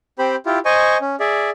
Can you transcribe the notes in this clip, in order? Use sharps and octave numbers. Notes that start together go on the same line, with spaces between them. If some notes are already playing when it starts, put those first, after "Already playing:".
C4 G4 C5 B5
E4 F4 G4
C5 D#5 G#5 C#6
C#4
G#4 D5 E5